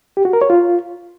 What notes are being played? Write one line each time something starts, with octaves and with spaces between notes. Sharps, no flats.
G4
F#4
A#4
C#5
F4